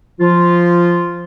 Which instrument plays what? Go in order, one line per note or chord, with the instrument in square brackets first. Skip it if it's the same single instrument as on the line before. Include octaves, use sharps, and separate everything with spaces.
[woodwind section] F3 F4